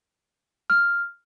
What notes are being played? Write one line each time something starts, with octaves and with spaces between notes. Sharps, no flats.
F6